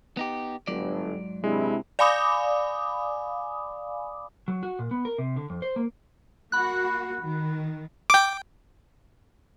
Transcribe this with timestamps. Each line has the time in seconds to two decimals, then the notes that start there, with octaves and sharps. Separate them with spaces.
0.17 B3 D#4 G4
0.67 G1 G#2 F#3 D5
1.44 C3 G#3 D4 E4
1.99 D5 F5 G#5 B5 D6 D#6
4.48 F#3
4.63 F#4
4.79 A#2
4.91 B3
5.05 A#4
5.18 C3
5.36 D3
5.50 F2
5.62 C5
5.76 A#3
6.52 A#3 F#4 B5 F#6
7.21 D#3
8.10 G5 D6